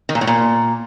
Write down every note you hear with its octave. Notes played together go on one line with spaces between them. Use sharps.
D#3
A#2
A2
A#2